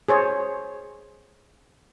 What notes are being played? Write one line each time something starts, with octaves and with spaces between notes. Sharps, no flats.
G#4 C5 C#5